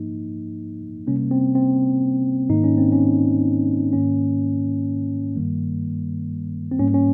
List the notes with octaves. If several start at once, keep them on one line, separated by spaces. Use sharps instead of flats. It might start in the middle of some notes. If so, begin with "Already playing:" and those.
Already playing: G#2 F3 A#3 D#4
C3 G3 A#3 C#4
C4
C4
G#2 D#3 A#3 D#4
C#4
C4
C#4
G#2 D#3 A#3 C#4
G2 D#3 G3 A#3
C4
G#2 G3 A#3 C#4
C#4